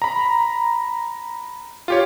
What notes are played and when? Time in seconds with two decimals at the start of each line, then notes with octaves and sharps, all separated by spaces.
0.02 A#5 B5
1.88 F4 G4 C#5